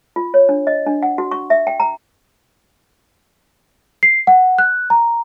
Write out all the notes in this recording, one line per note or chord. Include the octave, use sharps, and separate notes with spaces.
F4
C#5
D4
D#5
D4
F#5
F#4
C#6
E5
G5
A#5
C7
F#5
F#6
A#5